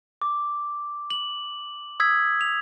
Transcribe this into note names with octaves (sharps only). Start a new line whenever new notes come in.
D6
F#7
D#6 E6 G#6 B6
F7